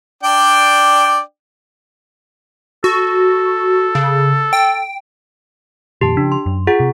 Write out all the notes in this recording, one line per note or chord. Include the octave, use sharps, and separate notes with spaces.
D4 D5 G5
F#4 A4
C#3
G5
F2 A#2 D#3 G4 A5
C#3 F3 D4
C6
F#2
F4 G#4 F#5
C3